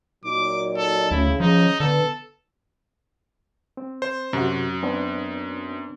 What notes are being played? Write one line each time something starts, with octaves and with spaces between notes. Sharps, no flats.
A#2 F#3 D#4 D6
A4
D2 C#3 E4
C#2 C#3 F3 D#4
D3 B3 A4
C4
C5
F#2 C3 F#4
B3 C4 D4